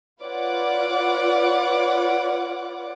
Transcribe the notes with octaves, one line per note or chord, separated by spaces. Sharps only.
F4 B4 C#5 D5 F#5 D6